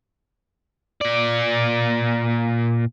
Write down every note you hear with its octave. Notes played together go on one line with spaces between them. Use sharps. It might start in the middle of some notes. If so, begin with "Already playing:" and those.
A#2 D5